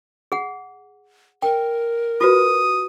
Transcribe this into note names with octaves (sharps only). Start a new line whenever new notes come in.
G#4 F#5
A#4 G5
F4 F#4 B4 D#6